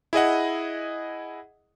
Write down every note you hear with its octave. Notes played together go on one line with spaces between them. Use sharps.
E4 G#4 D#5 F#5